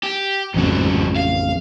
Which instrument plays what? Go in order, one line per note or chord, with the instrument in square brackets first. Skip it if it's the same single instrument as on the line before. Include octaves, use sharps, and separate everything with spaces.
[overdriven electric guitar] G4
[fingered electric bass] A1 F2 C#3 [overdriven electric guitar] G#2 F#3
[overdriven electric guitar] F5